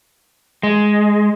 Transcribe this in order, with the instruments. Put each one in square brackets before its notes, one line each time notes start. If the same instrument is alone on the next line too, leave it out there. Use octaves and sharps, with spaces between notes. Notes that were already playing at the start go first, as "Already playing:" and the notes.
[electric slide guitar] G#3